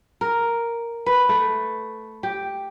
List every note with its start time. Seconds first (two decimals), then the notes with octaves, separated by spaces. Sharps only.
0.21 A#4
1.06 B4
1.29 A3
2.23 G4